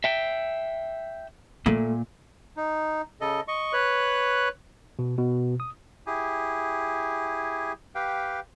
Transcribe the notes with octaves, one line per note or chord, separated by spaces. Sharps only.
E5 G5
A#2 A3
D#4
C#3 A4 D#5
D#5 C#6
B4 C#5 F#6
B2
B2
D#6
E4 G4 G#4 G#5
G4 B4 F5 G5